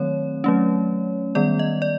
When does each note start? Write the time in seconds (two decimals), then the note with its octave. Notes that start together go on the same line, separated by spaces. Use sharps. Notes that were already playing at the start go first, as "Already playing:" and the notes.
Already playing: D#3 F#3 A3 C4 C#5
0.44 F#3 A3 C#4
1.35 D#3 G3 B3 D5
1.59 D#5
1.82 D5